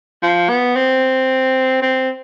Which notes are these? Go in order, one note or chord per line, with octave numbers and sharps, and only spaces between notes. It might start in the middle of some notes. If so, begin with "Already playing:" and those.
F3
B3
C4
C4